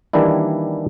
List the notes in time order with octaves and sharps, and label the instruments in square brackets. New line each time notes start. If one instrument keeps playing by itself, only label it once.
[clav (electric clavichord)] D#3 E3 G3 A#3 D4 E4